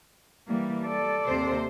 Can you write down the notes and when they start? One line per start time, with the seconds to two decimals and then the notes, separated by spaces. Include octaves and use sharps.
0.48 E3 G3 A#3
0.86 A4 D5
1.25 D#2 C3 C5